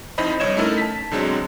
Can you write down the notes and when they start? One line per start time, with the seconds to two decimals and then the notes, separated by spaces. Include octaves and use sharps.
0.18 F2 D#4 E4 C5 D#5 B5
0.40 C2 G2 C#5 D#5 G#6 E7
0.57 A3 C#4 D#4 E4 A4 A#4
0.78 A5 B6
1.11 B1 D3 F#3 G#3 C4 D4